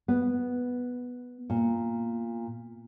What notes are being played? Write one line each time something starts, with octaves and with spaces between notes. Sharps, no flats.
B3
A#2